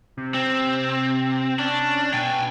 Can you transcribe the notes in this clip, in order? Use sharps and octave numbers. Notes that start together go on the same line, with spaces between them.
C3
C4
C#4 D4
B2 G5 G#5